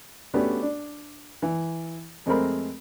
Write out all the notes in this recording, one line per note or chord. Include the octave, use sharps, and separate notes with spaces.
A3 B3 C#4 D4 F#4 G4
D4
E3
F2 G#3 A3 C4 A#4 B5